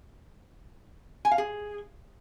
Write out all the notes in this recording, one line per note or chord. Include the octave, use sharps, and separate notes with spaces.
G#5
F5
G#4